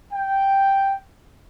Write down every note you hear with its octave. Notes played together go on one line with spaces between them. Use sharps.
G5